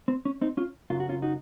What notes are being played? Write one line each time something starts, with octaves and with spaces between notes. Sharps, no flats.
C4
C#4
C4 D#4
C#4 F4
F#2 C#3 F#3 F4
F#4
C#4 F4
D#4 F#4